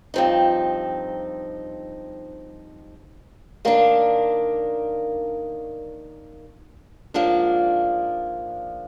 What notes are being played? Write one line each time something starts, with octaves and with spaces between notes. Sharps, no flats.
G2 F3 C4 D#4
D#3 A#3 D4
G#2 F3 A#3 D4